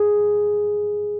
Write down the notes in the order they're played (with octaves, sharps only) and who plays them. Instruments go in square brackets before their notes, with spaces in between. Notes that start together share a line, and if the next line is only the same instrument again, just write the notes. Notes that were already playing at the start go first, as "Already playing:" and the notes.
Already playing: [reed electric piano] G#4